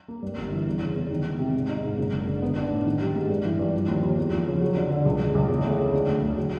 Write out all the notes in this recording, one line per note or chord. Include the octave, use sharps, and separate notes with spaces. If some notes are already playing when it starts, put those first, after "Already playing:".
A#3
G2
G1
E3
E2
C#3
E2
D#3
G#3
C3
G#2
D#4
G#2
F#1
D3
D3
B3
D4
A2
D#3
G3
G#2
G2
E3
G2
F3
D#2
D#2
E2
F3
C#3
F#3
D3
D3
C#2
C#2
C#2
E2
A3
C#3
D3
D2
D2
F#3